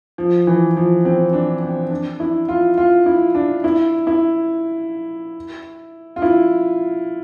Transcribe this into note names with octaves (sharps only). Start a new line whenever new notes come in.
F3
E3
F3
C4
D4
C4
D4
E4
F4
F4
E4
D4
E4
E4
F4
E4